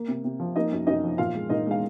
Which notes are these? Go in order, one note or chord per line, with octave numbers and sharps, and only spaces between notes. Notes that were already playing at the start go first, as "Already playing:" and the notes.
Already playing: A#3
C3
C3
F3
A#3 D#4 D#5
F#2
F#2 D#4 D#5
F3
A#2 F4 F5
G#3
A#2 D#4 D#5
G#3 F5